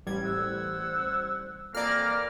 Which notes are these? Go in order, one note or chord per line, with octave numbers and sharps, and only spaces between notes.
A1 G3 G#6
C5 F#5 E6
F2 E3 A#3 D5 F6